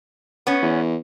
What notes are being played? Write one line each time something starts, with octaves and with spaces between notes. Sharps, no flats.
B3 C#4
E2